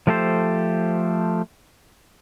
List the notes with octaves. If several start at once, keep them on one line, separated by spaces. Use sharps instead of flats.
F3 A3 G4 A4 C5